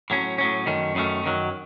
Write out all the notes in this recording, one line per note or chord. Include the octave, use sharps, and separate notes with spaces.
A2 F#3 C#4
A2 F#3 C#4
F#2 D#3 A3 C#4
F#2 D#3 A3 C#4
F#2 D#3 F#3